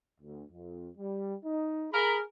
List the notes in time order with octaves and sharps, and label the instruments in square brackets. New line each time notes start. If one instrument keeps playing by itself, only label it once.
[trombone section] D2
F2
G3
D#4
[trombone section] G#4 [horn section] A#4 B5